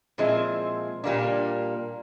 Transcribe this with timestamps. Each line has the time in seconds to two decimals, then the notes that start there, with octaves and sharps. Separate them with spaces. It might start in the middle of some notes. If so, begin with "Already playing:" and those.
0.18 A#2 F3 G#3 C4 E4
1.04 A#2 G3 A#3 D4